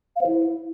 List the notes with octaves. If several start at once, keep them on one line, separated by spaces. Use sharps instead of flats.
F5
C5
E4